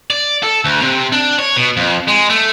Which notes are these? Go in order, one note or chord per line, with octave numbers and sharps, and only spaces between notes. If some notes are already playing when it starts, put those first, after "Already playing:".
D5
A4
D2
C3
D4
C#5
B2
F2
G#3
A3